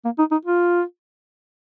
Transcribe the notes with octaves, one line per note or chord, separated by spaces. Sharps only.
A#3
D#4
D#4
F4